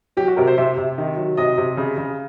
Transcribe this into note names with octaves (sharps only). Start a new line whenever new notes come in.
F#3 G4
F#4
C3 A#4
C5
C3 E5
C3
D#3
F#3
C3 D#5
C3
C#3
C#3